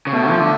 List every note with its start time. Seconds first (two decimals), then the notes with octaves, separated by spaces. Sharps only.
0.07 C#3
0.12 B2 A3
0.30 F3
0.40 D3